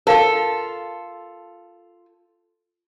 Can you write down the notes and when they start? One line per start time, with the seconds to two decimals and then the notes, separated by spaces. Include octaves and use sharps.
0.07 F4 A4 A#4 F5